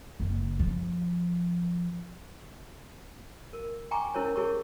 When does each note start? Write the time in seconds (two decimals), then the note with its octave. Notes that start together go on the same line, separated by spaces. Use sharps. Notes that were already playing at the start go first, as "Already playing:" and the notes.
0.20 F#1
0.59 F3
3.53 A#4
3.91 G5 G#5 A#5 C#6 D6
4.14 C#4 E4 A#4 C5 C#5
4.36 E4 G4 G#4 A#4 C#5 C#6